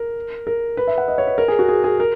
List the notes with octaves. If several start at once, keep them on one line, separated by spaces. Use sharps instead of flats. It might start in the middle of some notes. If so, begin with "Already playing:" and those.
Already playing: A#4
A#4
B4
E5
F#5
D#5
C#5
B4
A#4
G#4
F#4
G#4
G#4
A#4